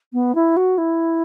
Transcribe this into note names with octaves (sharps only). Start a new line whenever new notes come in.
B3
E4
F#4
E4